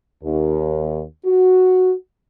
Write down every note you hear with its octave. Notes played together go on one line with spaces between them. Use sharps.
D#2
F#4